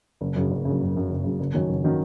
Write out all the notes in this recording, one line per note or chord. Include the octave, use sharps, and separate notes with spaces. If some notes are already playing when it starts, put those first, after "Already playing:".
F#1
F#2 C#3
F#1
C#3
F#2
F#1
F#2 C#3
F#1
F#2 C#3
F#1
F#2 D#3 F#3 C#4
F#1
D#3 F#3 C#4